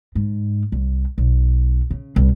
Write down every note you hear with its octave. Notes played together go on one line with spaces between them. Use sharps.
G#2
C2
B1
C#3
C2